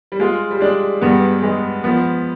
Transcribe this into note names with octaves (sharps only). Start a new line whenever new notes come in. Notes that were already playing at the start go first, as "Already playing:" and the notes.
G3
G#3 F4
G3
G#3 D4
G2 B3
G#3
F3 B3